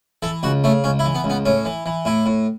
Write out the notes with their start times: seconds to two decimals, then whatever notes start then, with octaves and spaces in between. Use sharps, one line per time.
0.23 E3 A4
0.43 C#2 F#4
0.64 C#3 A3
0.84 C#2 C#4
0.99 E4
1.05 E3
1.15 B3
1.24 C#2
1.30 B3
1.46 A2 C#4
1.65 E3
1.86 E3
2.05 A2 E4
2.26 A2